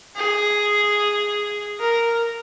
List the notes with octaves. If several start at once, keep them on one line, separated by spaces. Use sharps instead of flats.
G#4
A#4